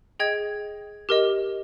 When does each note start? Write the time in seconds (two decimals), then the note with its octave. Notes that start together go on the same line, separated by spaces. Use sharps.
0.20 G#4 D#5 G5 G#6
1.09 G4 A#4 D#5